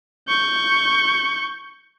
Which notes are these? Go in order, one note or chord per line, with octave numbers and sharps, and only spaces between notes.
C#6 G6